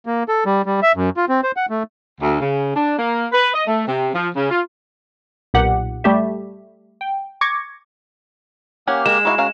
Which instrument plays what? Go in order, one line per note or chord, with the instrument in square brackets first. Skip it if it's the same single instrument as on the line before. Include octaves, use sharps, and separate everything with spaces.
[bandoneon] A#3
A4
G3
G3
E5
F#2
F4
C4
C5
F#5
A3
[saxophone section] D2
C#3
D4
A#3
B4
D#5
A3
C3
F3
C#3
F4
[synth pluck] B1 A#2 G4 F#5
G3 A3 G4 E5
G5
C#6 D6 G#6 A#6 C#7
[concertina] A#3 G4 F6 [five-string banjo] C#4 F#5 G#5
[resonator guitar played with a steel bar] G#3 [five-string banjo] A#4 [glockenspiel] E7
[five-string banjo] D#4 D#5 F5 [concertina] E4 F#4
[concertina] C#4 F#4 [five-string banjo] A#4 F5